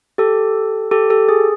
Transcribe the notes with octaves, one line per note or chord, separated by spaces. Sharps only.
G4 A4
G4 A4
G4 A4
G#4